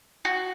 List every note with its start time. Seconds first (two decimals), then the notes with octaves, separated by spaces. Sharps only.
0.25 F#4